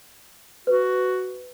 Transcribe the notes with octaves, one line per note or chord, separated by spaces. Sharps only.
F#4 B4